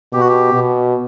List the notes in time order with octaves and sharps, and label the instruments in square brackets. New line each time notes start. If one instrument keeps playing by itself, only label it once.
[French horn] B2 [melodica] G4
[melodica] F#4
G4
[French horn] B2